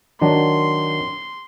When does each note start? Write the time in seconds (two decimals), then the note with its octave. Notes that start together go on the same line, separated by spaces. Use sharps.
0.21 D#3 F#3 D4 C6